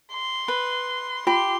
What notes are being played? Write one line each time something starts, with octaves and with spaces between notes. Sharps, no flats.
C6
B4
F4 G4 C6